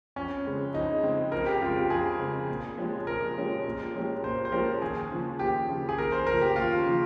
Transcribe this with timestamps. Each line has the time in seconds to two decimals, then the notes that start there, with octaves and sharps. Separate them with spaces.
0.16 F2 C#4
0.46 C#3 G#3 C4
0.74 F2 D#4
1.03 C#3 G#3 C4
1.32 F2 A#4
1.46 G4
1.62 C#3 G#3 C4 F4
1.76 G4
1.90 F2 G#4
2.19 C#3 G#3 C4
2.49 A#2
2.77 F3 G#3 C#4 G4
3.07 A#2 A#4
3.35 F3 G#3 C#4 G4
3.65 A#2
3.95 F3 G#3 C#4 G4
4.24 A#2 C5
4.45 C5
4.52 F3 G#3 C#4 G4 A#4
4.82 D#2 G#4
5.11 C#3 F3
5.39 D#2 G4
5.69 C#3 F3
5.89 G#4
5.98 D#2 A#4
6.12 C5
6.27 C#3 F3 A#4
6.41 G4
6.56 D#2 F4
6.85 C#3 F3